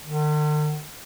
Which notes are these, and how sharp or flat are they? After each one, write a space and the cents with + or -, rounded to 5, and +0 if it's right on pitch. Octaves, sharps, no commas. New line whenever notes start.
D3 +45